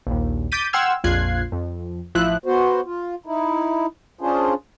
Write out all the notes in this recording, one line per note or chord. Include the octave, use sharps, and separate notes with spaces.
A#1 D#2
D6 G6 A6 B6 D#7
F#5 G5 C6 E6 F6 G#6
A#1 F2 F4 F#6 G#6 C7
F2
A1 F3 E4 E5 F#6
B3 F#4 C5
F4
D#4 E4
C#4 D4 F4 G#4 C5